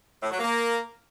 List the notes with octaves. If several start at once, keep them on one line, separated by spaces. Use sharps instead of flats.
A2
F#3
A#3